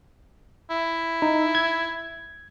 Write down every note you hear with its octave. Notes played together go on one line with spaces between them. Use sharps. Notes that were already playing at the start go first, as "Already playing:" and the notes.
E4
D#4
G#6